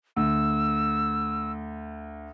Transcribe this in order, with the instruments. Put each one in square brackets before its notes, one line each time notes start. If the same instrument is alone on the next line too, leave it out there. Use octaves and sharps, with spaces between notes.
[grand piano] D2 [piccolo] E6